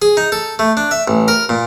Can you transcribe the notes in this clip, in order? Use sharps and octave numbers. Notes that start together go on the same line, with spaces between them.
G#4
D#4
A4
A3
D4
E5
A1
A#4
A#2